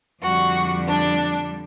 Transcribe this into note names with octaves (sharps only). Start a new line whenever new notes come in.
F2 D3 G3 F#4
D4